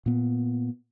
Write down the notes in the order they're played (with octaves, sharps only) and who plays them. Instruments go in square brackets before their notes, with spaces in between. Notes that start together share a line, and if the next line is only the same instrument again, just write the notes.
[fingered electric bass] A#2 B3